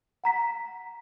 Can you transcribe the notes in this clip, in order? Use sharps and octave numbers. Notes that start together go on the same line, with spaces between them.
F#5 A#5 B6